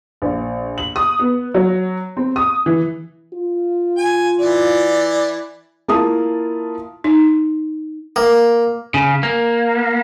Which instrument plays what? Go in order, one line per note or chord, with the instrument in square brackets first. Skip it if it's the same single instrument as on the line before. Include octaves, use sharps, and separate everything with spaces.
[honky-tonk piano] A#1
F#7
D#6
B3
F#3
C4
D#6
E3
[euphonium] F4
[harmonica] G#5
E3 D5
[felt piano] A#3 E4 F4 A5 D#6
[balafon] D#4
[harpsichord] A#3
[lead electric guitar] C#3
A#3